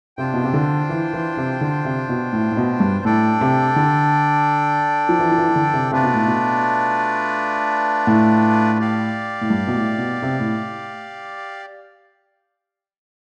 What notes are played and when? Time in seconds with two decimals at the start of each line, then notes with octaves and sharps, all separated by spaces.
0.17 C3 D4 F4 C5 G5
0.34 B2
0.44 C3
0.54 D3
0.89 E3
1.13 E3
1.37 C3
1.61 D3
1.85 C3
2.09 B2
2.33 A2
2.51 A2
2.57 B2
2.80 G2
3.05 A2 D4 A4 D5 G5
3.41 C3
3.76 D3
5.09 F3
5.19 E3
5.32 F3
5.38 E3
5.49 E3
5.56 D3
5.74 C3
5.91 C3 A3 D4 F4 B4 D5
6.03 B2
6.14 A2
6.26 B2
8.07 A2
8.79 G4 D5 F5
9.41 A2
9.50 G2
9.67 B2
9.74 A2
9.98 B2
10.22 C3
10.40 A2